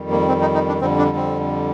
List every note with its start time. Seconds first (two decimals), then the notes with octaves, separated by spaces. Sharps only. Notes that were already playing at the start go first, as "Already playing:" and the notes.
Already playing: F2 D#3 G3
0.11 A#3
0.28 C4
0.41 D#4
0.54 D#4
0.68 D4
0.81 F2 D3 G3 C4
0.98 D4
1.17 C4